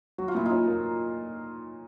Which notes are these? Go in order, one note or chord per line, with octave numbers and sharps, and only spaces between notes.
F#3 F#4
F4
A#2 E4
D#4 F4
C#4
A#3